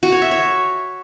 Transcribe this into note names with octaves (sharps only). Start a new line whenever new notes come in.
F#4
C#5
E5
C#5